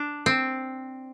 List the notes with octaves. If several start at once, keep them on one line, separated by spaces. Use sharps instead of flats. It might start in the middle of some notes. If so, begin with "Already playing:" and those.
Already playing: D4
C4